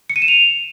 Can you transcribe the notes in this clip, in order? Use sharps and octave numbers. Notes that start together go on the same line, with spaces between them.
C#7
D#7
E7
F7